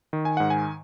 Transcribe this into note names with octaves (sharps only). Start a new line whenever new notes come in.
D#3
G#5
G#2 F#5
G#5